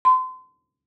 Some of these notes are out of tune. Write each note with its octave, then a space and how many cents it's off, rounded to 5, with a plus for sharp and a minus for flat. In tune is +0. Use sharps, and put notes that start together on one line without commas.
C6 -35